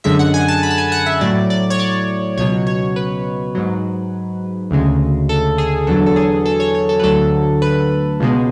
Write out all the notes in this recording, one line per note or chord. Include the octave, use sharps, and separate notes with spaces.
F#2 D3 G#3 E5
F#5
G#5
A5
B5
A5
G#5
F#5
E5
A2 F#3 D5
D5
C#5
D5
C#2 B2 F#3 C#5
C#5
B4
G#2 F#3
D2 C#3 G#3
A4
G#4
E2 D3 F#3 A4
A4
G#4
A4
C#5
C#5
A4
B4
D2 D3 F#3 A4
B4
C#2 B2 G#3